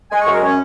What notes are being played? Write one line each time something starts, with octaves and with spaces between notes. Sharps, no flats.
G#3 G#5
C#6
F#2
A#4
C#4 C#5